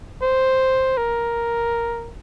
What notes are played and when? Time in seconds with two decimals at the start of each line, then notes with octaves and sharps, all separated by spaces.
0.22 C5
0.97 A#4